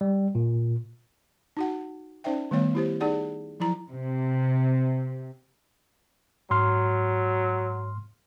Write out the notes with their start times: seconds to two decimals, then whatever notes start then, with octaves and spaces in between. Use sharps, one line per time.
0.01 G3
0.35 A#2
1.57 D#4 F#4 F#5
2.24 C#4 D#4 C5 D5 E5 G5
2.51 D#3 G3 A3 B3 C#5 F5
2.75 E4 G4 C5
3.00 D#4 G#4 D5 F#5
3.60 F3 F#3 E4 A#5
3.91 C3
6.51 G#2 F#3 C6 F6